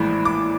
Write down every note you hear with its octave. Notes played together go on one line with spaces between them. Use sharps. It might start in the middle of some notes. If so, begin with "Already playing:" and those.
Already playing: A#1 A2 E3 G#3 B5
D6